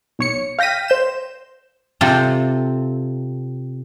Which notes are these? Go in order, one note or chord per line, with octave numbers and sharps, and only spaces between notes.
B1 C#5 C#7
F5 G5 A#6 B6 D#7
C5 G6 E7
C3 C4 F4 A4